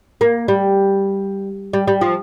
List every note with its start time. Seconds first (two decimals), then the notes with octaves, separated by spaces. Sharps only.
0.21 A#3
0.48 G3
1.73 G3
1.87 G3
2.01 F3